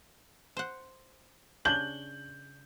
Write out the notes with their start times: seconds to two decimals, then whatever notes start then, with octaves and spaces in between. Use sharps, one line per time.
0.57 C5 F#5
1.65 C#3 D4 G6 F#7